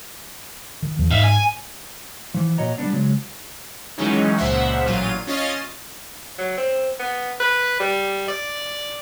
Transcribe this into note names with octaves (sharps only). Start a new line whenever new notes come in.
D#3
E2 E3 F3
G#2 E5 F5
G#5
E3 F3
A#2 F#4 C#5 D#5 A#5
G3 G#3 B3 D4
C#3 F#3 G#3
D#3 E3 F#3 G#3 C#4 D#4
C#2 A#2 F3 C5 E5 F#5
A1 A#2 F#3 F4 D#7
C#4 F4 C#5 D#5 A6 C7
F#3
C4
B3
B4
G3
D5